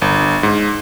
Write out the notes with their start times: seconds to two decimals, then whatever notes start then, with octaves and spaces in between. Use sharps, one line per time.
0.02 G1
0.43 G#2